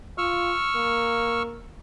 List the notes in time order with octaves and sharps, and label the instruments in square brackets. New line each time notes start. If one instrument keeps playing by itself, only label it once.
[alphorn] F4 [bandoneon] C#6 E6 F6
[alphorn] A#3